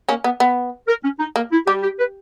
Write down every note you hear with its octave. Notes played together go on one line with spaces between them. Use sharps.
A#3 C#4
B3
B3
A#4
C#4
D#4
A#3
E4
G3 G4
G4
B4